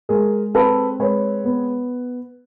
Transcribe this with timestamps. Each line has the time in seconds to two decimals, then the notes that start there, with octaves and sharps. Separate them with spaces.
0.09 G#3 G#4 A#4
0.54 C4 A4 B4
0.99 G#3 B4 C#5
1.44 B3